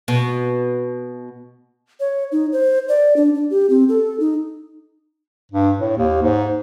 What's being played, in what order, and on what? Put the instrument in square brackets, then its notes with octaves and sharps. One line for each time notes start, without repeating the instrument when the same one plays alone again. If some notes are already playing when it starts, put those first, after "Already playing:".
[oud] B2
[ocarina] C#5
D#4
C5
D5
D4
D4
G4
C4
A4
D#4
[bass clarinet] G2
A2
D#2
G#2